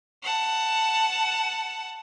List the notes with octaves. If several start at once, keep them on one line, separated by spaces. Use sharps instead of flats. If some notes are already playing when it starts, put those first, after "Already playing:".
F#5 A5